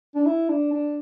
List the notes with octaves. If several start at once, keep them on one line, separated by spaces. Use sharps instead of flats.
D4
E4
D4
D4